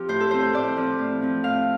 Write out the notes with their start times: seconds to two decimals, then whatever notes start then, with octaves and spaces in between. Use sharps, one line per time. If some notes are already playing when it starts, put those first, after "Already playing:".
Already playing: F3 C4 G4
0.09 A2 C5
0.20 A4
0.31 F3 C4 C5
0.42 C5
0.53 A2 D5
0.77 F3 C4
0.98 A2
1.22 F3 C4
1.44 A2 F5